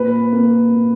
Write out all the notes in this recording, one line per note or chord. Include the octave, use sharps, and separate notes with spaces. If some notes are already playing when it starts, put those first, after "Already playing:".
Already playing: A#2 B4
A#3
A#2